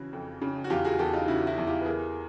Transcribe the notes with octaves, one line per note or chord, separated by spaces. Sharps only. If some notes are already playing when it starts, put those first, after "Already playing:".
Already playing: C#3 E3 F#4
F2
C#3
F#4
E2 F4 G4
F#4 G#4
E2 G4 A4
D#4 F4
C#3 E4 F#4
E4 F#4
E2
F4 G4
B4
E3 G#4 A#4